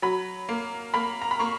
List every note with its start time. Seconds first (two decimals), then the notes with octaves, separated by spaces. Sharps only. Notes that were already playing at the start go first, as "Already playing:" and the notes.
0.02 F#3 B5
0.49 A#3
0.94 A#3 B5
1.22 A#5
1.31 B5
1.39 A#3 C#6